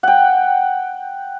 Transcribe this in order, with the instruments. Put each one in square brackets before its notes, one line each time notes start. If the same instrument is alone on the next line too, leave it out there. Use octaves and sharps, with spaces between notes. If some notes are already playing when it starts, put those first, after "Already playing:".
[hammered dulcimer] F#5 G5